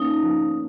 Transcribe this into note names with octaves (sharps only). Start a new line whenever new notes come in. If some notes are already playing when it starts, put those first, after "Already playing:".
Already playing: A#3 C#4 D#4
F3